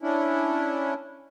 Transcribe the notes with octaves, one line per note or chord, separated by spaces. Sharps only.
C#4 D4 E4